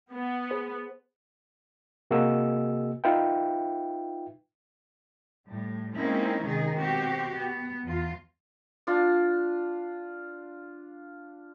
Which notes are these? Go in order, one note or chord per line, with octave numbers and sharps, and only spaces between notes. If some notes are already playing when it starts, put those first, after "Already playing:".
B3
G#4 C5
C3 A#3 F#4 G#4 D#5 E6
D#4 F4 B4 E5 G5
A2 G3
G#3 A#3 C4 C#4 D#4 E4
C3 D#3 G#3 D#4 G#4
B2 C4 F#4 G4
B3
E2 F4
D4 F4